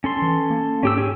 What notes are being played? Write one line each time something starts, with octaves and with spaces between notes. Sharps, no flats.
C#4 A4 C6
E3
A#3
G#2 C#4 G4 E6
G4 G#4 C#5